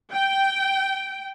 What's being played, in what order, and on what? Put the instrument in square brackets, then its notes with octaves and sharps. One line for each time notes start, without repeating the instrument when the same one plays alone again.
[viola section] G5